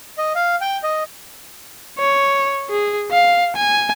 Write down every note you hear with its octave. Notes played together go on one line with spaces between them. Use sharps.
D#5
F5
G5
D#5
C#5
G#4
F5
G#5